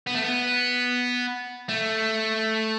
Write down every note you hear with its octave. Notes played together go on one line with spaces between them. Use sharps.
B3
A3
B3
A3